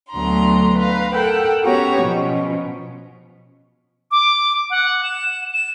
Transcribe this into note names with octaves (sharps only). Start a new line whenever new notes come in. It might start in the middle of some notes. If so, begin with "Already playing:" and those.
D2 F#3 B3 D4 A#5 C6
B4 F5 A#5
A4 A#4 F#5 G5 E6
B3 C#4 F#4 G4 C#5 A#5
B2 F3 C#4
D6
F#5
E7
E7